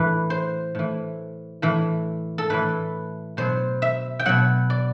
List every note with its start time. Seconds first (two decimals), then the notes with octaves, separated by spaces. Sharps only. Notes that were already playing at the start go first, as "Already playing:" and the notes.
Already playing: A2 E3 B4
0.30 C5
0.75 A2 E3
1.62 A2 E3
2.38 A4
2.50 A2 E3 B4
3.37 B2 F#3 C5
3.82 E5
4.19 G5
4.26 B2 F#3 F#5
4.70 D5